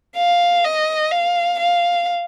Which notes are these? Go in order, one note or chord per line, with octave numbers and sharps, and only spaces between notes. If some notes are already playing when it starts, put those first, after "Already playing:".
F5
D#5
F5
F5